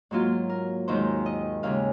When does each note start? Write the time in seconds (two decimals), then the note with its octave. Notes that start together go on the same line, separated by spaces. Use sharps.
0.11 G#2 F#3 A#3 F4
0.50 A#4
0.88 D#2 D#3 G#3 C5
1.26 D#5
1.63 D#2 C#3 G#3 F5